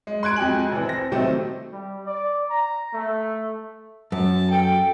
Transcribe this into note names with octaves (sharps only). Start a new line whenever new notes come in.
G#3
C6 F#6 G#6 D7
F2 G#3 F#4 G4 G#5 F#7
F1 E3
C4 A#6
C3 D#3 F#3 G3 A3 C4
G3
D5
A#5
A3
F#2 A5
A4 G5